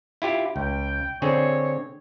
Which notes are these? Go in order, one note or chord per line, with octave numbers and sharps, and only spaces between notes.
E4 F4 G4
C#2 G5
D3 C4 G#4 C#5